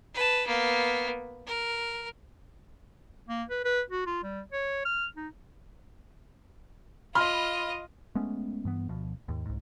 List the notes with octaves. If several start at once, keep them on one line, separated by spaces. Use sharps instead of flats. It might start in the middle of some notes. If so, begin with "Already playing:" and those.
B4 A5
A#3 B3
A#4
A#3
B4
B4
F#4
F4
G3
C#5
F6
D#4
F4 D#5 B5 C6 F6
G#3 A3 B3 C#4
G2 E3 B3
D2 B2 F3
D#2 G#2
C2 G#2